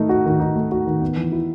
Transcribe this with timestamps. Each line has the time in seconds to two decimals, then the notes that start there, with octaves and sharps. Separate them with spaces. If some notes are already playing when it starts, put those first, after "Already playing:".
Already playing: D#3 A3 D#4
0.09 F#4
0.25 D#3
0.40 D#4
0.56 A3
0.71 F#4
0.87 D#3
1.01 B3
1.17 E3
1.32 E4